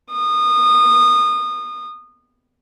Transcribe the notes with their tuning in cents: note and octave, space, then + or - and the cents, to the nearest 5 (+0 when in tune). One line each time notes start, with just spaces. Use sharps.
D#6 -25